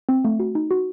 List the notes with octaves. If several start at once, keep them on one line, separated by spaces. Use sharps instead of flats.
C4
A3
F#4
D#4
F#4